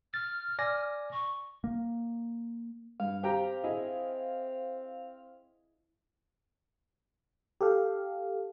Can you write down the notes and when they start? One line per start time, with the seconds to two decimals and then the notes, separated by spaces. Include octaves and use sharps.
0.14 F6 A6
0.59 D5 G#5 A#6
1.13 C#6
1.64 A#3
3.00 G2 F5
3.23 C4 G4 G5 A#5
3.64 E4 G#4 D#5
7.61 G4 A4 F5